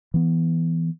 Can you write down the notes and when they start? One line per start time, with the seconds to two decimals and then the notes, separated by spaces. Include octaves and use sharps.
0.14 E3 B3